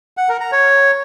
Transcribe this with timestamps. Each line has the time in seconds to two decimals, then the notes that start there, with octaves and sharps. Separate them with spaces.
0.17 F#5
0.29 A#4
0.40 A#5
0.52 C#5